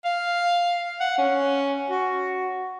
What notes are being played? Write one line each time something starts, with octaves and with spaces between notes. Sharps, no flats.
F5
F#5
C#4
F#4